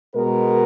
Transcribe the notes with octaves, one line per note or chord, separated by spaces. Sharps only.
B2 G#3 A#4